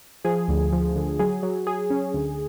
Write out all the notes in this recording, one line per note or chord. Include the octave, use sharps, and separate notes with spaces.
F3 G#4
D2
F3
D3
F#3 G#4
F#3
F#3 G#4
C#4
D2